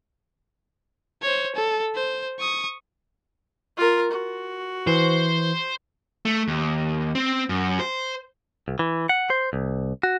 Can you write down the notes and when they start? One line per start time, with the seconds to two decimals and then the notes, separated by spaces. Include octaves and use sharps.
1.22 C5 C#5
1.55 A4
1.95 C5
2.39 C#6 D#6
3.77 F4 A#4
4.11 F#4
4.87 E3 C5
6.25 A3
6.48 D#2
7.15 C4
7.49 F#2
7.80 C5
8.68 C2
8.79 E3
9.09 F#5
9.30 C5
9.53 C2
10.03 F#4